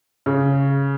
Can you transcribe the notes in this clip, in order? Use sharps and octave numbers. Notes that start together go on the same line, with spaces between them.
C#3